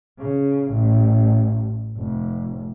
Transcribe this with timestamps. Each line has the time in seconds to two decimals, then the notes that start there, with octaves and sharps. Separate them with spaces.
0.18 C#3
0.70 A1
1.97 F1